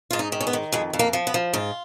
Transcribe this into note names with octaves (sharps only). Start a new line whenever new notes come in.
G#2 F4
D#4
D#3
C#4
B3
D#3
F2 G#3
F2
A#3
F3
B3
F3
G#2 F4